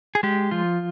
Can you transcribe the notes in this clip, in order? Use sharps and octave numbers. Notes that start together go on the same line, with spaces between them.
G#4
G#3 G4
F3 F4